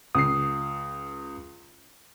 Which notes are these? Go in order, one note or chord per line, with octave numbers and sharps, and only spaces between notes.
C#2 D#6 C7